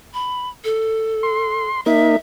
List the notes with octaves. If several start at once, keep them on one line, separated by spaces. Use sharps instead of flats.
B5
A4
C6
A#3 D#4 E5